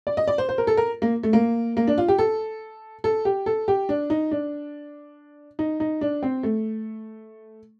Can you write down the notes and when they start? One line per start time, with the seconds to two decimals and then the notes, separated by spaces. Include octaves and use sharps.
0.07 D5
0.17 D#5
0.28 D5
0.38 C5
0.49 C5
0.58 A#4
0.67 A4
0.77 A#4
1.02 A#3
1.23 A3
1.33 A#3
1.77 A#3
1.87 D4
1.98 F4
2.08 G4
2.19 A4
3.04 A4
3.25 G4
3.46 A4
3.68 G4
3.89 D4
4.10 D#4
4.31 D4
5.59 D#4
5.80 D#4
6.01 D4
6.23 C4
6.43 A3